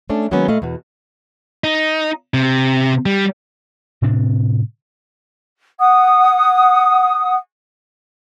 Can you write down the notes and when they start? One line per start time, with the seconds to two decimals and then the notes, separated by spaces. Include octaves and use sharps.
0.10 A3 C#4 D4
0.31 D#3 F#3 G#3 A#3 B3 C#4
0.48 A#2 A3 D#5 F5
0.62 E2 B2
1.64 D#4
2.34 C3
3.06 G3
4.02 A2 C3 C4 D4
5.80 F#5 D#6